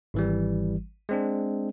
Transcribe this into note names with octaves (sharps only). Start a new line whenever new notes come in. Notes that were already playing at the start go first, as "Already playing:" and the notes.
G#1 E3 G3
G#3 C4 D4